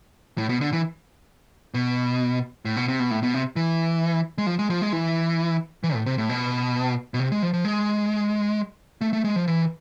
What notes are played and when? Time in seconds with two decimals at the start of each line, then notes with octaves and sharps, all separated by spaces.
0.38 A2
0.49 B2
0.61 D3
0.73 E3
1.74 B2
2.65 A2
2.77 B2
2.88 C3
2.99 B2
3.11 A2
3.23 B2
3.34 C3
3.56 E3
4.38 G#3
4.47 F3
4.59 G#3
4.70 F3
4.82 G#3
4.92 E3
5.83 E3
5.94 A2
6.06 C3
6.18 A2
6.29 B2
7.14 B2
7.20 C3
7.32 G#3
7.42 F3
7.53 F3
7.65 G#3
9.01 A3
9.13 A3
9.25 G#3
9.36 F3
9.48 E3